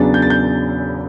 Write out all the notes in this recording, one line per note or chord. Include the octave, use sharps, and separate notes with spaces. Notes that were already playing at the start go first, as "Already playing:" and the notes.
Already playing: E2 C#3 F#3 B3 D4 A6
G6
A6
G6